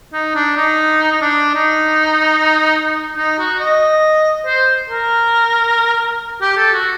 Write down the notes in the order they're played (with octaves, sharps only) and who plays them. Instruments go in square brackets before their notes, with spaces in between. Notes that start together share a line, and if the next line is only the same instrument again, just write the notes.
[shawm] D#4
D4
D#4
D#4
D4
D#4
D#4
F#4
D#5
C5
A#4
G4
A4
F#4